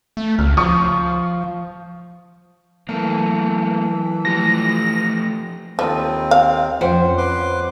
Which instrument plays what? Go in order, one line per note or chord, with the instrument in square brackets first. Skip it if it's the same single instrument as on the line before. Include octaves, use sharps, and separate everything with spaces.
[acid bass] A3
[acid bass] C#2 [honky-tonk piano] F6
[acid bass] F3 [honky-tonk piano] C#6 D#6
[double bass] E3 [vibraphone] F#3 A5 [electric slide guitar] A3 A#3
[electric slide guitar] F3 A3 G4 [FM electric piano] A#6
[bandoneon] D#2 C4 [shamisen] F3 [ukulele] A4 B4 D#5
[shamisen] F5
[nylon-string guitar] F2 C5 [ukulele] C#4 F#5 G5
[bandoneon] B4 C6 D6